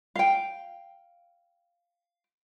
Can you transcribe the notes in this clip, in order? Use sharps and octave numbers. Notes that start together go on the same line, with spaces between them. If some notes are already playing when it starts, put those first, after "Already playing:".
F5 G5